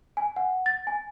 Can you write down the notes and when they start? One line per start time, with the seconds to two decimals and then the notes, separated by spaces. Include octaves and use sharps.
0.17 G#5
0.36 F#5
0.66 A6
0.87 G#5